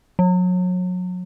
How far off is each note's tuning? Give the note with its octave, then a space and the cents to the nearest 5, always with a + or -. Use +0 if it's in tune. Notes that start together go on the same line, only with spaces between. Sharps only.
F#3 -30